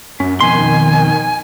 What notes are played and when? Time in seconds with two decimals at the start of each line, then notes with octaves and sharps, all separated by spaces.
0.20 F#2 C#4
0.40 F2 B2 D#3 G#5 C6